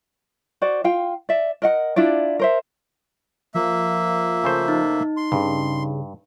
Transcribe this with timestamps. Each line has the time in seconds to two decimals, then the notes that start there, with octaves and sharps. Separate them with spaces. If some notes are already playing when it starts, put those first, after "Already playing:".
0.62 F#4 C5 D5
0.84 F4 F5 G5
1.29 D5 E5
1.62 A#4 D#5 F#5
1.96 D4 E4 F4 D5
2.39 A#4 C5 E5
3.55 F3 A#3 E5
4.44 C#3 A3 C5
4.68 D#4
5.17 C6
5.32 G2 C#3